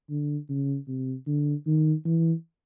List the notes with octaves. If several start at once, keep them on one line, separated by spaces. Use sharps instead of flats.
D3
C#3
C3
D3
D#3
E3